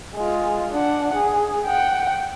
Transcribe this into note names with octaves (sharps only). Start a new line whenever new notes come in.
G#3 F4
D4 F#5
G#4
F#5 G5